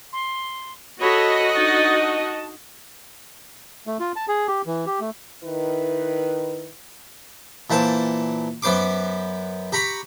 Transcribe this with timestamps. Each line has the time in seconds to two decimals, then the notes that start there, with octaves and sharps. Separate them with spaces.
0.12 C6
1.00 F#4 A4 C#5 D#5 B5
1.54 D4 D#4 A6
2.01 A5
3.87 A3
4.00 F4
4.16 A5
4.28 G#4
4.48 G4
4.66 E3
4.86 G4
5.00 A3
5.44 D#3 E4 B4
7.70 A#2 E3 C5 A5
8.62 F#2 B3 C5 C6 D6
9.72 G4 A#5 B5 C#6